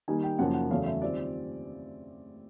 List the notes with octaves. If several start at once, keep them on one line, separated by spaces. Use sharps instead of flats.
D#3 G3 A#3 D#4 G#5
G5
F#2 C#3 F3 A#3 D#4 F#5
F#5
E2 C#3 F#3 A3 C#4 F5
E5
D#3 G3 C4 F4 D5